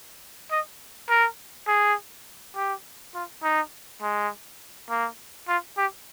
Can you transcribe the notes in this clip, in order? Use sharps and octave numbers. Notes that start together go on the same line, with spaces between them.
D#5
A#4
G#4
G4
F4
D#4
G#3
A#3
F4
G4